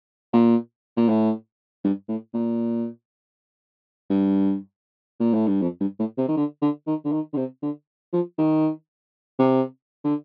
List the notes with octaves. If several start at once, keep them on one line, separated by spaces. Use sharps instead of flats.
A#2
A#2
A2
G2
A2
A#2
G2
A#2
A2
G2
F2
G2
A2
C3
D#3
D3
D3
D#3
D3
D#3
D3
C3
D3
F3
D#3
C3
D3